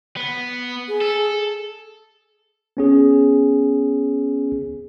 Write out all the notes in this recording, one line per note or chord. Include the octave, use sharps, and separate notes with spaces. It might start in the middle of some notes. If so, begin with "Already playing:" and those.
B3
G#4
A4
B3 C#4 G#4